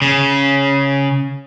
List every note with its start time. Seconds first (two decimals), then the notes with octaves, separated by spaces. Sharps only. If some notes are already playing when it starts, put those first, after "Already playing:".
0.02 C#3